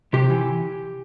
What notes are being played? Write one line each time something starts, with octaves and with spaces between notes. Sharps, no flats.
C3 G4
E3